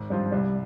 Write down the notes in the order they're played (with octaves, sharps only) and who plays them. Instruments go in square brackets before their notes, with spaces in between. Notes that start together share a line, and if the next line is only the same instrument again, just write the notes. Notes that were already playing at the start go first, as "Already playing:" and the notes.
Already playing: [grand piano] G#1
[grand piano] G2 F3 C4 F4 [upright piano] G3
[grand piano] C2 [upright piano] G3